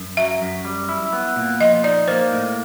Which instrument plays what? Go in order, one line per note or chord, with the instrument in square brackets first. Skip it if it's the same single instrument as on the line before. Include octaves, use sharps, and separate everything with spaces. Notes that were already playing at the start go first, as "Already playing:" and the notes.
Already playing: [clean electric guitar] F#2
[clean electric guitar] F#3 [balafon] E5
[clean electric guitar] F#2
G3
E4
B3
A#2
[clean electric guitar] F3 [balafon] D#5
[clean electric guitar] D#4 [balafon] D5
[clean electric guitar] A#3 [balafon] C5
[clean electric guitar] A2